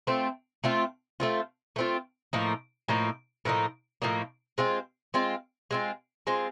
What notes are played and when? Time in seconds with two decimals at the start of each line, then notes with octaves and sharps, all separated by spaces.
0.07 A3 C4 F4
0.64 A3 C4 F4
1.20 A3 C4 F4
1.76 A3 C4 F4
2.33 A2 F3 A#3 D#4
2.88 A2 F3 A#3 D#4
3.45 A2 F3 A#3 D#4
4.02 A2 F3 A#3 D#4
4.58 G#3 C4 F4
5.14 G#3 C4 F4
5.71 G#3 C4 F4
6.27 G#3 C4 F4